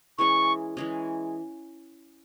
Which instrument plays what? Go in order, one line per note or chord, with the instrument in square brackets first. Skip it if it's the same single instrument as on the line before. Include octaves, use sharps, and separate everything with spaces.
[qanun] E3 G#3 C#4 G#4 [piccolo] C#6
[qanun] E3 G#3 C#4 G#4